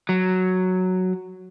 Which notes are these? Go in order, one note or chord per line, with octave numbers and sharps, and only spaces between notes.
F#3